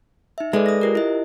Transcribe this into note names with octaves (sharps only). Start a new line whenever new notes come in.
D#4 E5
G#3 A4 B4 D5
D#6 A#6
F4 G4 A#4
E4 D#5